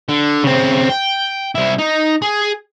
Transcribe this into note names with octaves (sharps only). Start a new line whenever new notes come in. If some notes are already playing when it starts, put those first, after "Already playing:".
D3
C#3 C4
G5
C2 E4
D#4
G#4